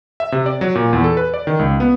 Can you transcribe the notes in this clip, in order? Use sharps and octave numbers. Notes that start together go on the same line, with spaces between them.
E5
C3
D5
F#3
A#2
E2
A4
B4
D5
D#3
C#2
B3